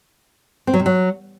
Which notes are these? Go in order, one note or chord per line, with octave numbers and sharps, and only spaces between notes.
C4
F#3
C3
F#3